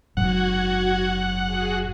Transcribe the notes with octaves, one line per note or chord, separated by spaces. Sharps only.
F#1 G#2 F#3 F#4 F#5 G#6
F#4 G#4